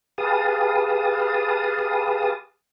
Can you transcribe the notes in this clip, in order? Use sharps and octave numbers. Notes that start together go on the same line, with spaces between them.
G4 G#4 B4 F5 A5 D#6